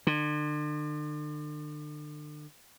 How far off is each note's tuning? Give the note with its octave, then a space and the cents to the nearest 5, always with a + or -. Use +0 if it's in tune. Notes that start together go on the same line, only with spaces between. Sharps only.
D3 +35